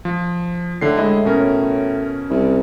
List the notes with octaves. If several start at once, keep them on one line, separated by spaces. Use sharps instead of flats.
F3
A2 D3 C7
G#3 E4 D#5
B2 C#4 A#4
C2